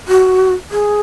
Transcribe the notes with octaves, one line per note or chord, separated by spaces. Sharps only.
F#4
G#4